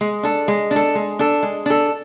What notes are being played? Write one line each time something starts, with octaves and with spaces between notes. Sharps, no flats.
G#3
D4 A4
G#3
D4
A4
G#3
D4 A4
G#3
D4 A4